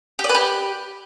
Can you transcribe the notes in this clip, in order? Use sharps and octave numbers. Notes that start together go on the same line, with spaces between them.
G4
D5
B4
G4